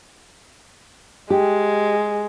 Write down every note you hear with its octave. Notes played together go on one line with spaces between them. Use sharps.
G#3 G4